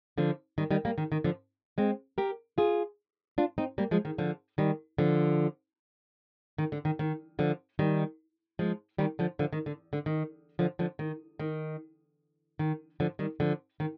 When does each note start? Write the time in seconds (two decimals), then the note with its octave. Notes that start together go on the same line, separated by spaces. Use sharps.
0.18 D3 F3
0.58 D#3 G3
0.71 D#3 G3
0.85 G3 A#3
0.98 D#3
1.12 D#3
1.24 D3 F3
1.78 G#3 C4
2.18 G4 A#4
2.58 F4 G#4
3.38 D4 F4
3.58 C4 D#4
3.78 G3 A#3
3.91 F3 G#3
4.05 D#3
4.18 D3 F3
4.58 D#3 G3
4.98 D3 F3
6.58 D#3
6.72 D3
6.85 D#3
6.99 D#3
7.39 D3 F3
7.79 D#3 G3
8.59 F3 G#3
8.98 D#3 G3
9.19 D3 F3
9.39 D3 F3
9.53 D#3
9.66 D3
9.93 D3
10.06 D#3
10.59 D3 F3
10.79 D3 F3
10.99 D#3
11.39 D#3
12.59 D#3
13.00 D3 F3
13.19 D#3 G3
13.40 D3 F3
13.80 D#3